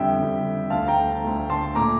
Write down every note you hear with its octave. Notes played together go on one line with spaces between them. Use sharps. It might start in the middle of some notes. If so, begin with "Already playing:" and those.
Already playing: F2 D3 G3 E5 G5
F2 D3 G3
D2 D3 A3 F5 A5
G5 A#5
D2 D3 A3
A5 C6
A#2 A3 A#5 D6